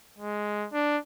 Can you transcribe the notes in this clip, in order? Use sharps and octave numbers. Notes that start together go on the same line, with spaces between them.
G#3
D4